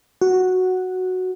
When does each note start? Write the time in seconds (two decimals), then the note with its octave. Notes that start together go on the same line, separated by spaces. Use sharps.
0.21 F#4